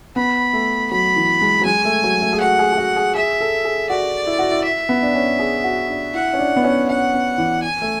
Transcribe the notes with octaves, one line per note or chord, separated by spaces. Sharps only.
B3 B5
A3
F#3 B5
E3
G#3
F#3
G#3 G#5
A3
F#3
A3
G#4
F#4 F#5
G#4
G#4
F#4
G#4
G#4 E5
A4
G#4
F#4 D5
E4
F#4
E4
E5
B3
D4
C#4
G#4
F#4
D4
E4 F#5
C#4
D4
B3
C#4
C#4 F#5
B3
E3
G#5
A3